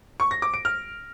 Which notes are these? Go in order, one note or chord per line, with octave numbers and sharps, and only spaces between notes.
C#6
A#6
D6
D7
F6